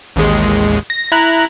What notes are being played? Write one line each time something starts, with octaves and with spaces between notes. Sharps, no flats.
A1 D#2 G#3
A#6
E4 A#5 F#6